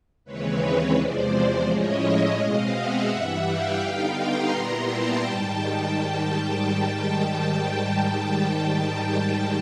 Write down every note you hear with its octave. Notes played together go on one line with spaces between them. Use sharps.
D#2 C#3 E3 G#3 C4 B4 C#5
E2 C3 F3 G#3 C5 D5
A2 F3 G#3 C#4 E4 C#5 D#5
B2 G#3 C4 D#5 F5
E5 F#5
G2 E3 G3
F5 G5
D3 G3 B3 D#4
A#5 C6
A#2 G3 B3 E4
G5 A5
G#2 D#3 G3